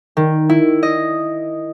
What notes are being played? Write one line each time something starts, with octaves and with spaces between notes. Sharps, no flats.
D#3
E4
D#5